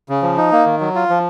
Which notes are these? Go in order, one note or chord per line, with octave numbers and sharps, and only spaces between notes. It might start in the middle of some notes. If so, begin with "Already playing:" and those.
C#3
F3
D#4
A#3
D#3
F#3
F4
F3